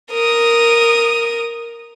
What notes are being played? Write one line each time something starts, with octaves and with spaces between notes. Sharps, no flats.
A#4 D#6